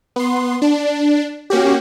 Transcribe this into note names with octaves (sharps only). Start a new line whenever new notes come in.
B3 C6
D4
A#3 C#4 F#4 G4